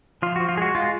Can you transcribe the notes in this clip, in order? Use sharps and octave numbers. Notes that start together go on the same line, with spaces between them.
F3 F4
F3 F#4
F4
G#3 F#4 G#4
G#3 F4